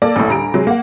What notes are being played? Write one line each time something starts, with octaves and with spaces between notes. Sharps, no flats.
A#3 A4 D5
A1 A2
D2 G3 A#5 D7
C3 F#3 G#3
A#3 F#5